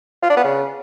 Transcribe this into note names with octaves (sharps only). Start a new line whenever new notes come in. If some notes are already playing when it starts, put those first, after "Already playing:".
F4
D4
B3
C#3